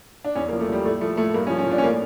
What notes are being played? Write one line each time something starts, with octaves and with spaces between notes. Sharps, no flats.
D4
E2 C#4
A#3
F3
A3
F3 G3
A2 A3
F3 A3
A2 A3
G2 A#3
C#4
F3
C#4
F3 D4
C#4
A2 A#3